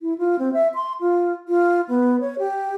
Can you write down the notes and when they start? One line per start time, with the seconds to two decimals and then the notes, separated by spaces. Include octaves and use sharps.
0.01 E4
0.18 F4
0.39 C4
0.53 E5
0.75 C6
1.01 F4
1.48 F4
1.89 B3
2.21 C#5
2.39 G4